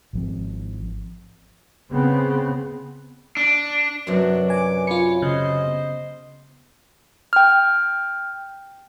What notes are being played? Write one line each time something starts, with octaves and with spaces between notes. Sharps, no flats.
G#1 F3 C4
C#3 B3 C4
D4
F#2 C3 F#3 D4 F#4 A#4 B4 D5
G#5 D6
F4 C#5 G#5 B5 C#7
C#3 C5 D#5
B3
G5 F6